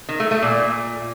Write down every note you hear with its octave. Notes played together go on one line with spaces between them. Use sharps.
D#3
A3
A3
A#2